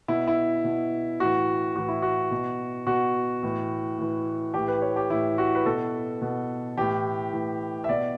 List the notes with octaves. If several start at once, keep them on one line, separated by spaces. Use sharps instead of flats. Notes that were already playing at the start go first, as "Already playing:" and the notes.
B2 E4
E4
B2
A2 E3 F#4
A2 E3 F#4
E4
F#4
B2
B2 F#4
A2 E3
A2 E3
A2 E3 G4
B4
C#5
G4
A2 E3 E4
F#4
B4
B2 A4
B2
A2 E3 G4
A2 E3
E5
B2 D5